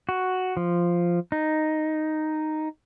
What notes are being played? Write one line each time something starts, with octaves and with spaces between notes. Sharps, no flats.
F#4
F3
D#4